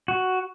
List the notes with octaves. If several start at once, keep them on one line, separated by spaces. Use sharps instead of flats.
F#4